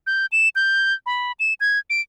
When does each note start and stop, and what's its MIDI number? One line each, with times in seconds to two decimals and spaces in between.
0.07 0.26 91
0.32 0.49 100
0.56 0.94 91
1.06 1.32 83
1.40 1.54 100
1.60 1.79 92
1.90 2.01 98